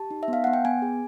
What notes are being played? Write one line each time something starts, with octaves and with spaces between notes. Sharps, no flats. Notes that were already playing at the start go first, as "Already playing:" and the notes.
Already playing: G4 A5
D#4
E5
B3
F5
B3 F#5
G5
B3 G#5
G#4